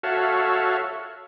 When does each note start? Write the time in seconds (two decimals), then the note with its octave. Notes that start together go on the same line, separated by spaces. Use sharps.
0.03 F#4 A4 C#5 E5 F5